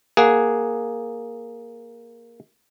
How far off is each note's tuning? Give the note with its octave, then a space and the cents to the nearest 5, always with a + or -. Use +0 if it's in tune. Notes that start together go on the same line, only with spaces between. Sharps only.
A#3 +0 G#4 +0 F#5 +0